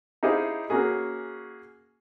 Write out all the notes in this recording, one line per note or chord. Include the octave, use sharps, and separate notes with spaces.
D#4 E4 G4 G#4 C5 F5
A#3 C#4 F#4 G#4